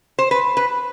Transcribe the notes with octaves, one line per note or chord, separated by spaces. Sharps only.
C5
B4
B4